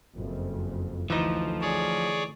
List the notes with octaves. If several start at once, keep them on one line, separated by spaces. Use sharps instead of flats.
F#1 F2 C#3
D2 E3 F3 D#4
G#4 C#5 D5